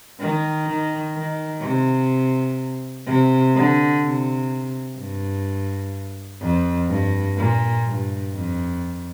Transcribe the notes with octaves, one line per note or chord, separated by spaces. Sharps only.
D#3
D#3
D#3
C3
C3
D3
C3
G2
F2
G2
A#2
G2
F2